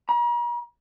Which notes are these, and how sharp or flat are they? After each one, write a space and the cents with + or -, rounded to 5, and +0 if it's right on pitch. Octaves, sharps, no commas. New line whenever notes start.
A#5 +45